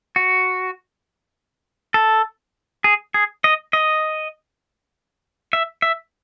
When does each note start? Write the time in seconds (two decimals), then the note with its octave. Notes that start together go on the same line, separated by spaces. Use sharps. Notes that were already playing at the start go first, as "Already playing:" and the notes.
0.16 F#4
1.94 A4
2.84 G#4
3.14 G#4
3.44 D#5
3.73 D#5
5.53 E5
5.82 E5